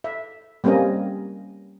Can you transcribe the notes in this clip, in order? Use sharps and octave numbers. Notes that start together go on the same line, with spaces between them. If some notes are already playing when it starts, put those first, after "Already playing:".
E5
G3 A#3 C4 C#4 A#4 D#5